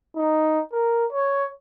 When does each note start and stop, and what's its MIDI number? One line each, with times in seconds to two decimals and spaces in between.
0.17 0.61 63
0.73 1.05 70
1.12 1.49 73